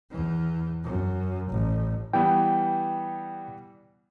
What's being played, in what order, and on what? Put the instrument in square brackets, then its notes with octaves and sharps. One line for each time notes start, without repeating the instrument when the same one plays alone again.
[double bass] E2 E3
F#2
A1
[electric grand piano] E3 G3 B3 [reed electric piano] G5